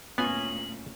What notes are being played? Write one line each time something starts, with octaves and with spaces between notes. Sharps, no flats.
D2 A#2 B3 C#4 F4 D#5 G#5 F#7